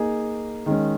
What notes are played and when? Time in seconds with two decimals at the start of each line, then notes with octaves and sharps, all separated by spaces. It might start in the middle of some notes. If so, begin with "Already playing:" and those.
Already playing: A#3 D#4 G#4
0.66 D#3 G#3 C#4